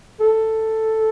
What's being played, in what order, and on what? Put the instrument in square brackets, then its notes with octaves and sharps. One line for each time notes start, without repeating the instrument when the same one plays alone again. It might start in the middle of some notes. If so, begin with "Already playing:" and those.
[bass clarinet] A4